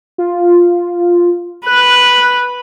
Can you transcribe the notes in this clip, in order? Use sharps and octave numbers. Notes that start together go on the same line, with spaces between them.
F4
B4 F#6